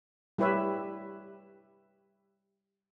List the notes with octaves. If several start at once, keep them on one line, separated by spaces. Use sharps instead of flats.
G3 E4 G4 B4 C#5 E5